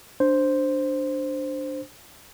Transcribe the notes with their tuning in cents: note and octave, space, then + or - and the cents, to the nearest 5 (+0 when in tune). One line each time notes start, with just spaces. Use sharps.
D4 +0 C5 +0